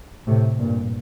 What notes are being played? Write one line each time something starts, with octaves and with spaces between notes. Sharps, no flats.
A2 C3
G2 A#2